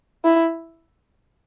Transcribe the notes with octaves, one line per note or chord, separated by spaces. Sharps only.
E4